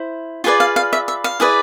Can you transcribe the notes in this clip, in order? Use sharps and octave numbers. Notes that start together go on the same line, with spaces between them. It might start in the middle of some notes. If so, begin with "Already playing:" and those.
Already playing: E4 C5
F4 G#4 B4 D5 C6
F5
F5
E5
E5
F5
E4 G#4 B4 D5